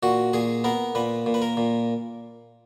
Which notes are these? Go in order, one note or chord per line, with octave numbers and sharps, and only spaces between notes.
A#2 F#4
A#2 G#4
B3 A#4
A#2 B4
A#2
B4
A#4
A#2